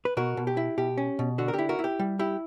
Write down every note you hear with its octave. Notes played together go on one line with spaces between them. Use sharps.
B4
B2 F#4 A#4
B2
G4
E4
B2 G4
C#4
B2
D3 F#4
A#4
E4 G4
F#4 A#4
E4
G4
G3
E4 G4